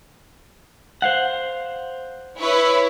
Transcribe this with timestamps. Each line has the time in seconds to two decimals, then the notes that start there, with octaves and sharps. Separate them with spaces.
1.02 C5 F5 F#5
2.39 E4 B4 C#5